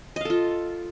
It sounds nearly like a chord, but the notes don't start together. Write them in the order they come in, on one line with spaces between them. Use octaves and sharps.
D#5 F5 A4 F4